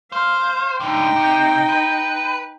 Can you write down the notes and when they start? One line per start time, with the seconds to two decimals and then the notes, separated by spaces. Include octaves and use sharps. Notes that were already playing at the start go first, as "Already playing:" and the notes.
0.12 C5 F5
0.80 A2 D3 D#4 G5
1.16 C3
1.69 B4